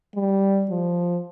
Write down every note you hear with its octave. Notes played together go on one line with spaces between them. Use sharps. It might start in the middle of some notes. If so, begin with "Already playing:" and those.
G3
F3